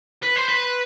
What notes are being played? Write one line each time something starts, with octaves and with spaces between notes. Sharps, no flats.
B4
C5
B4